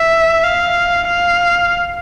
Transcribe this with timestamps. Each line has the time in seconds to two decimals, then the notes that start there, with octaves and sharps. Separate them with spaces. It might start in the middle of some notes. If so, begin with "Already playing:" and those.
Already playing: E5
0.43 F5
1.08 F5